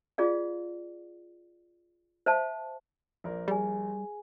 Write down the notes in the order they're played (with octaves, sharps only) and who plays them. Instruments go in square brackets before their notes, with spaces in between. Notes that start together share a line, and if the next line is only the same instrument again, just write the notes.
[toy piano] F4 G#4 D5 F5
C5 E5 F5 A5
[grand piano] A#1 A#4 D5
[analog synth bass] G3 [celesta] G#4 G#5